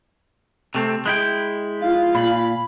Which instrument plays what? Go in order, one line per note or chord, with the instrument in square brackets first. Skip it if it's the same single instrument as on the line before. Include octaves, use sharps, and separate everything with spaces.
[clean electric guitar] C3 A3 C4
G#3 E4 G5
[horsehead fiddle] F4 [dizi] F5
[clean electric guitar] A#2 [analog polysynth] B5